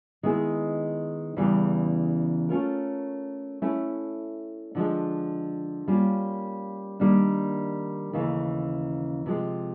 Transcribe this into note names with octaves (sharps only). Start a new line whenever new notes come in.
D#3 G#3 B3 E4 G#4
E2 C#3 E3 G3
A3 C#4 F4 A#4
A3 C#4 E4
D3 F3 G#3
G3 A#3 C#4 F4
D#3 G3 A#3 D4
D#2 C#3 E3 A3
C3 F3 G#3